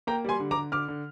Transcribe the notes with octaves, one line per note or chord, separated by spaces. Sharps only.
A#3 G5 A#5
G3 G#5 C6
D3
A#5 D6
D3
D3 D6 F6
D3